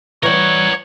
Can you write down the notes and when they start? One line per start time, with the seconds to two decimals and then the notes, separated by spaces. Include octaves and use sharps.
0.23 E3 G3 A#4 C#5 F#5